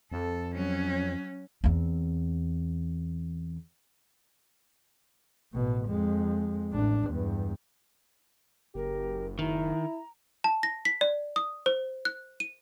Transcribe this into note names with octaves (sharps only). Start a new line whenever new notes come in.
F2 A4
F#3 C#4
E2 C4
A1 B2
F2 G#3
A1 D4
E2 G2
F#1 G4 A#4
D#3 E4 A#5
A5
A#6
B6
D5
D#6
C5
F#6
D#7